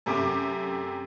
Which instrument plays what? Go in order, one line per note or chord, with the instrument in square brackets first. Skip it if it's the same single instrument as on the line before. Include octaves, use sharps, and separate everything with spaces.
[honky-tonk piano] F#2 C3 A3 G4 D6